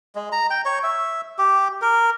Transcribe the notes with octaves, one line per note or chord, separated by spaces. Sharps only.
G#3
A#5
G5
C#5
E5
G4
A#4